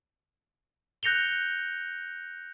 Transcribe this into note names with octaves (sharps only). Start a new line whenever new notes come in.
F#6 G6 A#6 C#7 F7 G7